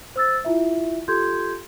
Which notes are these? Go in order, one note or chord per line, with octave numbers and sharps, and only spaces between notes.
C5 E6 A6
E4 F4 E5
F4 G4 A4 C6 G6 G#6